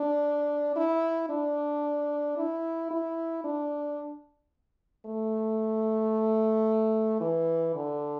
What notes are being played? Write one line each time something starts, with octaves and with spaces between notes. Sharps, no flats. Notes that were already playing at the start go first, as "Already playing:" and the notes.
Already playing: D4
E4
D4
E4
E4
D4
A3
E3
D3